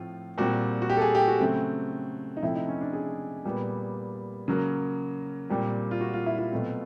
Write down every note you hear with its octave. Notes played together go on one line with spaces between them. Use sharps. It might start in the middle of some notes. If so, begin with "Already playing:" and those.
Already playing: A2 F3 A3 C4 F4
A#2 G3 C4 F#4
F#4
G4
A4
G#4
G4
F#4
C#3 F#3 A3 C4
D#4
C3 F3 A3 C4 E4
D#4
C#4
D4
G#4
A#2 G3 B3
C#3 F#3 A#3
A#2 G3 C4
F4
F#4
F4
E4
F4
B2 F#3 A3 C4